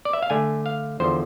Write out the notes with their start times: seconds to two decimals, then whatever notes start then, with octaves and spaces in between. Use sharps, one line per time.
0.05 D5
0.13 E5
0.22 F5
0.30 D3 A3 D4 G#5
0.66 F5
1.00 E2 D3 F3 C5